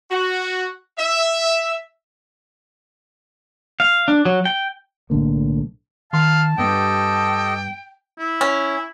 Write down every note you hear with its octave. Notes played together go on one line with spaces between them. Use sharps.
F#4
E5
F5
D4
F#3
G5
B1 A2 D3 A#3
D#3 F5 A5 C6
G2 B3 G4 A4 D#5 G5
E4
C#4